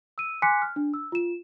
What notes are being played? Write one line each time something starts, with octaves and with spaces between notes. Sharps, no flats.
E6 D#7
G#5 C6 D6 F#6 B6 C#7
F6
D4
E6
F4 E7